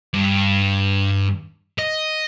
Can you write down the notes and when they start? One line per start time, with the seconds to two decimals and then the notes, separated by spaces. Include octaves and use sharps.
0.14 G2
1.79 D#5